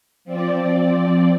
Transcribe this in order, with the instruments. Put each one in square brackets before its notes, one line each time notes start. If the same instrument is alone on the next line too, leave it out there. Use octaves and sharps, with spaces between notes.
[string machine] F3 C4 D5